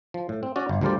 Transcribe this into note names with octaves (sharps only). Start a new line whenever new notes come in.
F3
A2
C4
C#4 F#4 D5
G1
D2 F3 G3 A#4 C5 D5